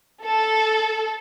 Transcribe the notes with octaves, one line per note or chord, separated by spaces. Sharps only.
A4